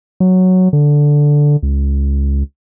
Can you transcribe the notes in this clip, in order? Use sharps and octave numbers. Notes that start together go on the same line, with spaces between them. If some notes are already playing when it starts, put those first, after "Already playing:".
F#3
D3
C#2